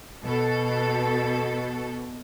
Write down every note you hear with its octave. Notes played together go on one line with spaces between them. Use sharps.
B2 A4